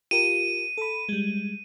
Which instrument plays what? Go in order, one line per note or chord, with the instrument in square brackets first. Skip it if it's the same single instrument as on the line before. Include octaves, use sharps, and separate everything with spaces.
[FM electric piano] F4 G4 A#4 [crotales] D#7
[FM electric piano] A4 B5
G3 G#3